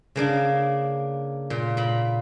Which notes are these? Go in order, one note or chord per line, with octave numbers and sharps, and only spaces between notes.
C#3 A#3 D4
A#2
A#2 B5